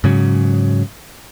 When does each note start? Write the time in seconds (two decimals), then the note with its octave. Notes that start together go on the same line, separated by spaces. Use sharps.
0.04 G#2 C#3 F#3